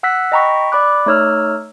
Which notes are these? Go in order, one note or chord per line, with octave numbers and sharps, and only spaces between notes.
F#5 E6 F#6 B6
D#5 G5 A#5 B5 C#6 B6
D5 B5 D6 F#6
A3 D#4 C#5 E6 F6